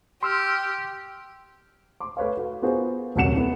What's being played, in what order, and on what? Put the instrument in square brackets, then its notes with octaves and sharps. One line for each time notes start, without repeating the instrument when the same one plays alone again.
[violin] G4 [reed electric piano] C6 E6 F6
[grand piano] C6 D6
A3 B4 C#5 F5
F#4
B3 F4 F#4 G#4 A#4 C5
D#1 C2 F#3 F#5 C#7 E7
A3 B3 E4